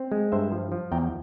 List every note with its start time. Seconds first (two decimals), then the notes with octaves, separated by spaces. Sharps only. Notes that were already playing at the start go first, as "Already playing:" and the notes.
Already playing: C4
0.12 G#3
0.32 G2 C5 E5
0.52 F3
0.72 F3
0.92 E2 G5 A#5